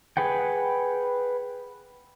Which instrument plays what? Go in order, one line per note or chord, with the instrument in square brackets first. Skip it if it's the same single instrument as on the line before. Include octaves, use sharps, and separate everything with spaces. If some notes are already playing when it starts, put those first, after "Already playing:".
[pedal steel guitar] G#4 B4 F#5 G5